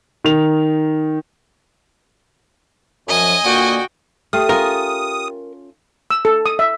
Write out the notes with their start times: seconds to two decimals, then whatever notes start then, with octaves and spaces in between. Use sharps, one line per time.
0.24 D#3 F7
3.07 F#2 F3 D#5 G#5
3.44 A#2 D3 A#3 F#4 G5
4.33 A3 G4 G5 D#6 F6
4.49 C#4 F4 A#4
6.10 E6
6.25 A4
6.46 D#6
6.59 E5